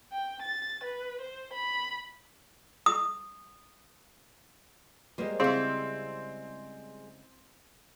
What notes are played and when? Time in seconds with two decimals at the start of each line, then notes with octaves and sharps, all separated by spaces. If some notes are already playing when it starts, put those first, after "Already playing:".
0.12 G5
0.42 A6
0.84 B4
1.21 C5
1.53 B5
2.86 D#6
5.18 G3 G#3 A#3 B4 C5
5.40 C#3 C4 E4 G#4 F5 C6